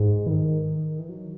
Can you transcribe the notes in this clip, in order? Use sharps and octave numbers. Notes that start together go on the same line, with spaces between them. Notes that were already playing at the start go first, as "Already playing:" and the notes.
Already playing: G#2
E3
D#3
E3
F#3